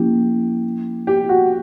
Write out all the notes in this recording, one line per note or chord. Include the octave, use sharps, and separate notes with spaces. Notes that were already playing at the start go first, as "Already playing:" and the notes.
Already playing: F3 A#3 C#4 E4 G4
G4
F#4